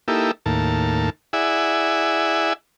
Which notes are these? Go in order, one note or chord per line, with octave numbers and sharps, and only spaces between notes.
A#3 D#4 E4 G4 A4
D#2 A2 A#3 A5
E4 G#4 D5 E5 F#5 G#5